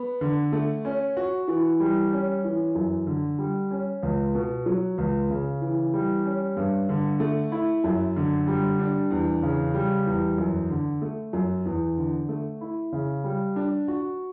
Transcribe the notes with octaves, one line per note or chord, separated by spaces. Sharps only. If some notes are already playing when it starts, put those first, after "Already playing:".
Already playing: B3
D3
A3
C#4
F#4
E3
G3
C#4
E3
F#2
D3
G3
C#4
C#2
B2
F#3
C#2
C#3
E3
G3
C#4
G2
D3
A3
E4
F#2
D3
G3
D4
E2
C#3
G3
E2
F#2
D3
A3
F#2
E2
D3
A3
E4
C#3
G3
D4
F#4